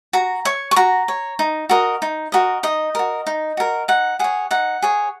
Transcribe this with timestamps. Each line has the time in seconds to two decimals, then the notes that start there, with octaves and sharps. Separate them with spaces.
0.13 F#4 A#5
0.45 C#5 C#6
0.71 C#6
0.76 F#4 A#5
1.08 C#5
1.39 D#4
1.69 F#4 A#4 D#5
2.02 D#4
2.32 F#4 A#4 D#5
2.63 D#4 D#5
2.95 F#4 A#4
3.27 D#4
3.57 F#4 A#4
3.88 D#4 F#5
4.19 G#4 C#5 F#5
4.51 D#4 F#5
4.82 G#4 C#5